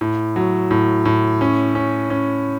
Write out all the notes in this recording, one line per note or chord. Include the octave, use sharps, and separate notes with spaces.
A2
F#3
A2
A2
C#4
C#4
C#4